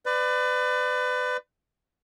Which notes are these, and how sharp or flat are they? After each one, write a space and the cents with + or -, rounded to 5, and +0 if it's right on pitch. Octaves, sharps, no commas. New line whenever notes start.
B4 +30 D5 +20